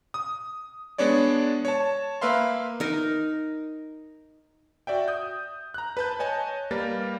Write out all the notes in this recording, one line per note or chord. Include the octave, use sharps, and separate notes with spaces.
D#6
G#3 B3 D4 C#5 D5
C#5 A5
A#3 B4 E5 F5 C6
D#4 A#4
F#4 D5 E5 G5
D#6 G6
A#5 F#6
B4 A5 G6
C#5 D#5 G#5 A5
G3 A#3 A#4 B4 A6